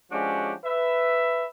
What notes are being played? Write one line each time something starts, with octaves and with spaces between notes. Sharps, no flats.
F3 G#3 C#4 D4 F#4 G4
B4 E5